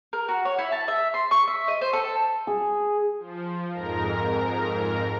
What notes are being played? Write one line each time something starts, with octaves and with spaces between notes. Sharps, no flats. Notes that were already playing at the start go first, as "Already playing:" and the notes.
A#4
F#4
C#5
E4
A5
E5
C6
C#6
E5
D#5
C5
A4
G#4
F3
F2 G#2 A#4 A#5